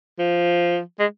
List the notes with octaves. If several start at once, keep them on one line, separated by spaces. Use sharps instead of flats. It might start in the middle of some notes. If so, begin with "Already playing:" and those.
F3
G#3